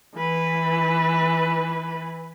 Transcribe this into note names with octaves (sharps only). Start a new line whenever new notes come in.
E3 B4